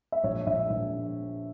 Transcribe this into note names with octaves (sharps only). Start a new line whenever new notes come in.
E5
A#1 C#5
A#1 E5
A#1